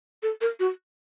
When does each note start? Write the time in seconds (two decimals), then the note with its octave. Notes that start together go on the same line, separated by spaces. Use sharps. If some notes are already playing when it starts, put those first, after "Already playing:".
0.23 A4
0.41 A#4
0.60 F#4